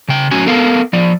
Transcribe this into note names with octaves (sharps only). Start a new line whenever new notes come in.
C#3 G5
F#2 A2 C#4 F#4 G#5
B3 A4 A#4 F5
F3 D5